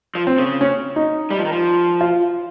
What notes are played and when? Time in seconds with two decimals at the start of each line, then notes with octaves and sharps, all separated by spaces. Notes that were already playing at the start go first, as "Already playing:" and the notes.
0.15 F3
0.27 C4
0.38 C#3
0.61 C#4
0.96 D#4
1.30 G3
1.38 F3
1.45 D#3
1.52 F3
2.01 F4